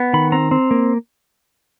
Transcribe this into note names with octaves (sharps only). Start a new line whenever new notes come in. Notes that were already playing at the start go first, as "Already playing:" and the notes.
Already playing: B3
D#3 B5
C4 A#5
C4
A#3